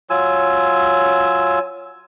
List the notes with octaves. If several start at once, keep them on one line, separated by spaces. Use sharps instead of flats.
F#3 F4 G#5 E6